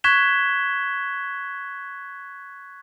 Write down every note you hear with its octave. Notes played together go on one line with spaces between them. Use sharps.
C#6 F#6 G#6 B6 E7 G7